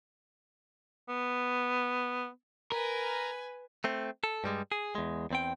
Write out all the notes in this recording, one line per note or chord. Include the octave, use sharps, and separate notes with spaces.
B3
A#4 B4 G#5
A3 C4
A4
G2 G3 G#3
G#4
E2 G#3
E2 C4 G5